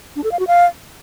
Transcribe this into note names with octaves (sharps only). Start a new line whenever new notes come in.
D4
A4
F5
F#4
F5